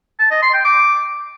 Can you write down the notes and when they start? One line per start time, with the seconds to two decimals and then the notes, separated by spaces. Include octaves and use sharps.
0.19 A5
0.31 D#5
0.42 C6
0.53 G5
0.65 D6